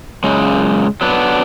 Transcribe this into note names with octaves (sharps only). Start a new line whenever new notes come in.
F#2 C#3 G#3
F#3 B3 D4